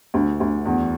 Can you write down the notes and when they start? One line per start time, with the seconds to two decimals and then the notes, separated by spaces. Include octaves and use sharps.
0.14 D2
0.40 D2
0.65 E2